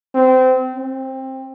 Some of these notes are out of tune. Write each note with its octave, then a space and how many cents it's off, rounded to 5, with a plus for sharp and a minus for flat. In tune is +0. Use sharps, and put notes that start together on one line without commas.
C4 -25
C4 +15